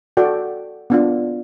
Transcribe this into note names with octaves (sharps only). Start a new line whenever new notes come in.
F#4 A4 D5 G5
B3 D4 F4